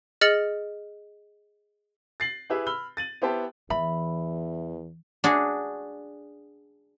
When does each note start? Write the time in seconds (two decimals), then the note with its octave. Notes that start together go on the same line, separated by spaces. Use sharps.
0.21 G#4 D#5 F6 A6 C#7 F#7
2.20 A6 C7 F#7
2.50 E4 G4 G#4 B4 E5
2.66 B5 E6 F6 G7
2.97 A6 D#7 F#7
3.22 B3 E4 G4 C5 G5 A5
3.70 E2 E3 E5 B5
5.24 D4 F#4 G#4